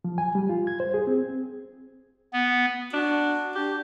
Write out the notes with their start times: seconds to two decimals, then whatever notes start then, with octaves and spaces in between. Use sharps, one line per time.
0.05 F3
0.18 G#5
0.35 G3
0.49 F4
0.67 G#6
0.80 C5
0.94 G#4
1.07 C4
2.33 B3
2.93 D4 F#4
3.55 D4 G4